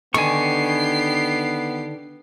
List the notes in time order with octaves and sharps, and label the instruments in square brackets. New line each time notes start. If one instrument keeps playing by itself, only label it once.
[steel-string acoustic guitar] D3 D#3 [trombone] B3 [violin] G4 C7 [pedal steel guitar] G#5 C#6